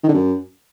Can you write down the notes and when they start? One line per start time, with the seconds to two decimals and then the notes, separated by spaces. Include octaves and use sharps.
0.04 D#3
0.09 D3
0.14 F#2